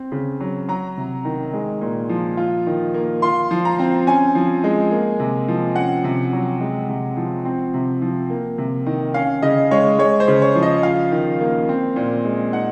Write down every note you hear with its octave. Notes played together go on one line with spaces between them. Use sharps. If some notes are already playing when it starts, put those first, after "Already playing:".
Already playing: C4
C#3
F#3
F#3 A#5
C3
D#3
G#3
A#2
F3
F4
D#3
A#3
F4 C6
F3
A#5
C4
C#4 G#5
F3
G#3
A#3
C3
F3
C#4 F#5
C3
F#3
G#3
C3
F3
C4
C3
F3
A#3
C3
D#3
C#4 F5
C#3 D#5
G#3 C#5
G#3 C#5
C5
C#3
C#5
F3
D#5
F4 F5
D#3
A#3
C4
A#2
G#3
D#4 F#5